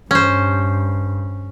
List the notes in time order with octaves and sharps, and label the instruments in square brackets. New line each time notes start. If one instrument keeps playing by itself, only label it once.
[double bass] G2 [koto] C#4 C5